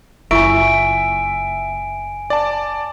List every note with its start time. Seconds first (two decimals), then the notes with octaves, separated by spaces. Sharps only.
0.31 F#1 E4 F4 E5 G#5 C#6 D7
2.30 D5 A5